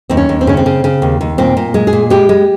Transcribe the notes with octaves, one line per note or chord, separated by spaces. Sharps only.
D#2 C4
C#4
D#2
C4
C#3 C#4
C4
C#3
C#3
D#2
D#2
A#2 C4
A#2
G#3
G#4
A#2
G#3 G4
G#3